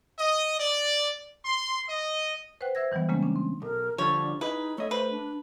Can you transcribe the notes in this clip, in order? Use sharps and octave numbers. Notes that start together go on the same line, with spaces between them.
D#5
D5
C6
D#5
B4 C5 F#5 G5 F#6
C5 E5 E6 G#6 A#6
D#3 E3 F#3 G3 B3
C#3 G3 G#3 A#3 B3 C#4
C#4 D4
C4
B1 A#4
D3 F3 G3 A4 C#5
D#4 E4 G#4 B4 D#5
A3 C#5 D#5 E5
B4 C5
D4